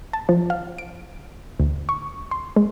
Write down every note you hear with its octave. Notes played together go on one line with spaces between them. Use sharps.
A5
F3
F5
D7
D2
C#6
C6
G#3